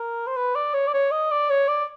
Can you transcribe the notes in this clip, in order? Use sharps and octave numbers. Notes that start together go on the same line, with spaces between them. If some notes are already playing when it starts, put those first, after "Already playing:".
Already playing: A#4
C5
B4
D5
C#5
D5
C#5
D#5
D5
C#5
D5